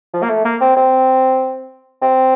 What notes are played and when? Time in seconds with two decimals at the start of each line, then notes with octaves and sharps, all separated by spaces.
0.14 F3
0.23 A#3
0.30 A3
0.45 A#3
0.61 C4
0.76 C4
2.02 C4